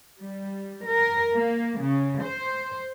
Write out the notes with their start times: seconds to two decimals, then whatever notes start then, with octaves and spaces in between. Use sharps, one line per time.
0.19 G3
0.87 A#4
1.35 A#3
1.82 C#3
2.23 C5